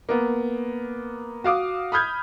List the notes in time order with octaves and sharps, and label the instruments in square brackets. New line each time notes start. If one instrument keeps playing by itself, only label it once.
[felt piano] A#3 B3
F#4 F5 D6 D#6
B5 D#6 F6 G6 G#6